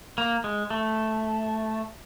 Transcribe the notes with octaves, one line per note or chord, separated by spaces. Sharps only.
A#3
G#3
A3